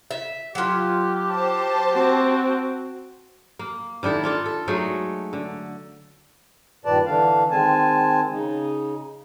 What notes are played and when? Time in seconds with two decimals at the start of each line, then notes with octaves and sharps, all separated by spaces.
0.11 E5
0.55 F#3 F4 G4
1.32 C5 A5
1.92 C4 F#4
3.59 A#3
4.03 D#3 D4 E4 A4
4.24 D4 F4 A4
4.46 A4
4.68 F#3 G#3 A3 D#4
5.33 D3
6.85 G2 A#2 D#3 B4 D5 A5
7.06 D3 E3 D4 F5
7.51 D#3 G#3 C4 G#5 A5
8.30 C#3 D#4